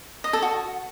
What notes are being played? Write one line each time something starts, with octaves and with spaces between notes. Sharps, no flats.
D#5
A4
F#4